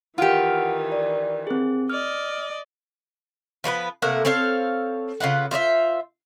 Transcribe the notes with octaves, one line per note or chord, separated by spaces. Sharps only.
D#3 E3 F4 G4 F#5 F6 D7
D5
C4 G#4
D5 D#5 F6
F3 B3 D4 B4
C3 A3 A#3 F#5
C4 A4 C#5 F5
C#3 F4 B4 F#5
F4 C5 D#5 E5